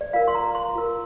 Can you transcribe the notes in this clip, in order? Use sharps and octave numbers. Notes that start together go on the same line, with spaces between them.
D5
F4 A#4 F5
C6
A#5
C6
F4 A#4